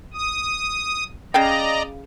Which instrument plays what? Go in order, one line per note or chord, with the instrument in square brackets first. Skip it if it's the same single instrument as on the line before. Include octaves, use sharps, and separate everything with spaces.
[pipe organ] D#6
[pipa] C#3 F5 G5 [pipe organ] D5 D#5 A#5